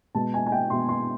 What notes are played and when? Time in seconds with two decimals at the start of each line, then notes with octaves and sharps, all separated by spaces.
0.15 B2 G#3 B3 A5
0.34 G#5
0.46 G#5
0.52 G5
0.70 B2 G#3 B3 C6
0.89 C6